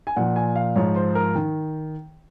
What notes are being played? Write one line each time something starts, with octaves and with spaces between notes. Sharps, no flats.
G#5
A#2 F3 F#5
G#5
F5
G#2 F3 C#5
C5
A#4
D#3